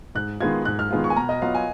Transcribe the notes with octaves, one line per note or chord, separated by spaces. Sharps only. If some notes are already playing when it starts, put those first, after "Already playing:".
G#2 F#6
D#3 G#3 B3 F4 G#6
G#2 F#6
F6
D#3 G#3 B3 F4
C#6
G#5
B2 A#5
D#5
F#3 B3 F4 F5
G#5